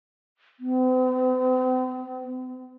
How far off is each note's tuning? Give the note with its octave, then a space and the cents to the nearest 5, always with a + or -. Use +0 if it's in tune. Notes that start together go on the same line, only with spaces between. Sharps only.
C4 -45